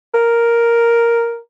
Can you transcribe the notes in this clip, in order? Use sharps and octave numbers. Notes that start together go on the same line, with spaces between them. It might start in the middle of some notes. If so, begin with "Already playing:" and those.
A#4